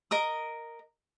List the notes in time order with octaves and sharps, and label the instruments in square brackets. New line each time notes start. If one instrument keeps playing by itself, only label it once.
[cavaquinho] A#4 D#5 D#6